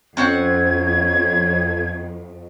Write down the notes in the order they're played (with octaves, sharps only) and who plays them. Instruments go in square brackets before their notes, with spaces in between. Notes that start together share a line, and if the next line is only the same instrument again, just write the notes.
[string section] F2 [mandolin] C4 C#4 F#5 [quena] G#6